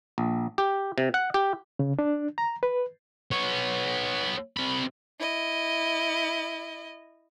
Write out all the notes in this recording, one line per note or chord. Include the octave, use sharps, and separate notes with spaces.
A#1
G4
C3
F#5
G4
C#3
D4
A#5
B4
B3 C#5
C3 B5
E4 D#5